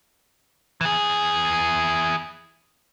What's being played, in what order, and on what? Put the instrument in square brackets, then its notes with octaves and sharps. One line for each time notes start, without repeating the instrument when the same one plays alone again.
[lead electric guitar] E3 G#4